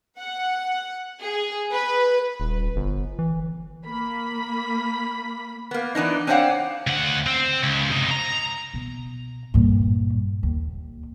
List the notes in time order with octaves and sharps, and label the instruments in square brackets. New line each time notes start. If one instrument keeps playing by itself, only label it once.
[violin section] F#5
G#4
B4
[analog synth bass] D#1
G1
E3
[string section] A#3 B5
[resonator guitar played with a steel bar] A#3 B3
E3 B3 D4 D#4
C4 D4 C5 C#5 F5 F#5
[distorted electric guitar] D2 F#5
C4
C#2
C3 D#4
A#5
[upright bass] B2
G2 A#2
D#2